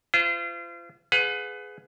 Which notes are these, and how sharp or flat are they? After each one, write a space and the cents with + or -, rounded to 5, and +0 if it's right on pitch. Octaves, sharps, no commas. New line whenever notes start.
F4 -35 C5 -35
G#4 +10 B4 +25 F#5 -45